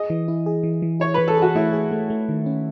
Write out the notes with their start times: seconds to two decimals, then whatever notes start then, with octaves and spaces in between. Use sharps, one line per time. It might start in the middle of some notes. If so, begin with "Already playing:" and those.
Already playing: G#4 D#5
0.10 E3
0.28 E4
0.46 G#4
0.63 E3
0.82 E3
1.00 E4 C#5
1.14 E3 B4
1.28 A4
1.37 G#4
1.42 F#4
1.55 A3 E4
1.73 G#4
1.91 A3
2.10 A3
2.29 D#3
2.46 C#4